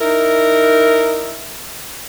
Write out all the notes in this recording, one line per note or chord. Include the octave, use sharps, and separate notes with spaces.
D#4 E4 A#4